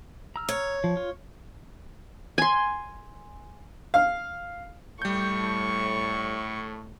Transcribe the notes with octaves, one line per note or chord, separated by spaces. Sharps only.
A#5 E6 F6
C#5
F3
F4
G#5 C6
F5
A2 G3 C#6 G6